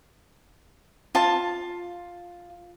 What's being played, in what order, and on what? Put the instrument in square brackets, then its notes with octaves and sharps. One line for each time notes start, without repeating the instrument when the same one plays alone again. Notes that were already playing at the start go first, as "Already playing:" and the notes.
[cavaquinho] F4 A5